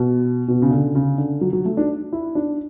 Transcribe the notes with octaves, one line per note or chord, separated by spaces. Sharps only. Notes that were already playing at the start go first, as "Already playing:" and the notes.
Already playing: B2
B2
C#3
D3
C#3
D3
F#3
F#3
A3
D4
E4
D4